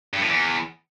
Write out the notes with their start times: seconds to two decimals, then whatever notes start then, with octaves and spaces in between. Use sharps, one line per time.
0.13 G2
0.21 A2
0.28 E2